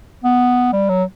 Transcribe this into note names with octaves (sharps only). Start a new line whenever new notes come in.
B3
G3
F#3